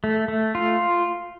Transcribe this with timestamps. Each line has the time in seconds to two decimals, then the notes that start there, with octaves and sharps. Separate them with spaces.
0.04 A3
0.28 A3
0.55 F4